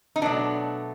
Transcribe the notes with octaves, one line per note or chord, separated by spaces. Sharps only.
D#4
B2 F#3 A3 D4